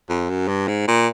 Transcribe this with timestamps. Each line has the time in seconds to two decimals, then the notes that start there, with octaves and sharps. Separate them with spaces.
0.09 F2
0.30 F#2
0.48 G2
0.68 G#2
0.87 A#2